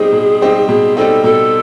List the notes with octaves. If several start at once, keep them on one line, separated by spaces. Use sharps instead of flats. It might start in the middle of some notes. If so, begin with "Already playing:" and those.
Already playing: B2 G3 C4 D#4 G#4
B2
G3 C4 D#4
B2 G#4
G3 C4 D#4 A4
B2 A4